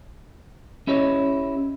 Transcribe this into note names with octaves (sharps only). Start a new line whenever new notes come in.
C#4 E4 G4 C#5 D#5